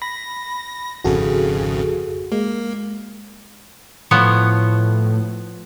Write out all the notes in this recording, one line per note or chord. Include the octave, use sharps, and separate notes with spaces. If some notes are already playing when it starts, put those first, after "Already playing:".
B5 A#6
G#1 F2 C#3 F#4 G#4 A4
G#3 A#3
A2 F3 B3 C#5